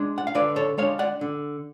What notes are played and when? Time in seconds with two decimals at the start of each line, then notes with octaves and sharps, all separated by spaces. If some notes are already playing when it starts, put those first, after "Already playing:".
Already playing: G#3 D4
0.18 F#5
0.27 F5
0.35 D3 B4 D5
0.56 A4 C#5
0.78 G#3 D4 C#5 F5
0.99 D5 F#5
1.21 D3